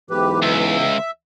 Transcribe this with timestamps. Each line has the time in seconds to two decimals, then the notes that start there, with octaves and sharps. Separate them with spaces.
0.10 B1 G#2 E3 G4 B4
0.42 C#2 E5